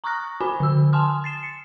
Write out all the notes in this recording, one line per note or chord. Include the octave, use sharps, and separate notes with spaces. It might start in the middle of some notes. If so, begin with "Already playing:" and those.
A#5 C#6 D#6 F6 F#6 A#6
F#4 C5 G#5 B5
D3 E6
G#5 A5 C6 D#6 F6
A6 C7 E7
C#7